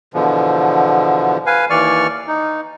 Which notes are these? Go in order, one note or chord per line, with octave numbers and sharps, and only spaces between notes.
E2 B2 D3 F3
B4 F5 G#5
D#2 E3 D5 C#6 F6
D#4